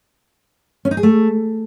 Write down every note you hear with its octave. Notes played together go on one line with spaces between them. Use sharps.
C#4
D#4
G#4
A3